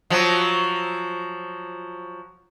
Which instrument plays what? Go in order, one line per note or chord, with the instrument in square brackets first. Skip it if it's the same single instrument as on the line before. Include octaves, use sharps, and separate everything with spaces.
[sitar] F3 F#3